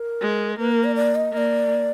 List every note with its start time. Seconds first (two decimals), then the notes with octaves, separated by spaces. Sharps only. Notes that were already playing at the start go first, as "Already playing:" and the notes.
Already playing: A#4
0.22 G#3
0.59 A#3 B4
0.72 A#4
0.84 D5
0.96 D5
1.15 D#5
1.33 A#3 D#5
1.37 D5